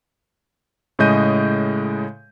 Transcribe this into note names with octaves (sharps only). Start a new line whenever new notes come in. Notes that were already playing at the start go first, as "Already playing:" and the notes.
A2 C#3 G#3 D#5 G6 D#7